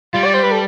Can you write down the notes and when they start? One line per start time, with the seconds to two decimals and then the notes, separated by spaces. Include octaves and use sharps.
0.14 G3 F4
0.25 D5
0.34 C5
0.43 B4
0.52 A4